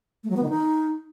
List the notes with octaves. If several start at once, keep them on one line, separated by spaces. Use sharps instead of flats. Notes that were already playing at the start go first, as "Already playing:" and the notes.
A3
F#3
B3
D#3
D#4